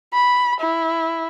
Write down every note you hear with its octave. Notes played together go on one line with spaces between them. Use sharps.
B5
E4